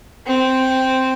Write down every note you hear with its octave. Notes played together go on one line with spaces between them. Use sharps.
C4